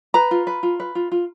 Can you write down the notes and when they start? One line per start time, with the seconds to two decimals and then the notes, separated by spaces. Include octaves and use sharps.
0.14 B4 A#5
0.31 F4
0.47 B4
0.63 F4
0.80 B4
0.95 F4
1.12 F4